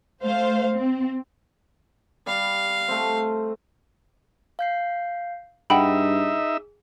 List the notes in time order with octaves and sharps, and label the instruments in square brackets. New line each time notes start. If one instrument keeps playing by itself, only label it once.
[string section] A3 C5 F5
C4
[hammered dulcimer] G3 [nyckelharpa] F5
[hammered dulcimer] A3 C4
[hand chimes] F5 G6 C7
[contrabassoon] G2 [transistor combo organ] D#4 E5 [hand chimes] G#4 [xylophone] F#5 G5 B5